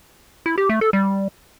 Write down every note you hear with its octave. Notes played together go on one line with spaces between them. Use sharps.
E4
G4
A3
A4
G3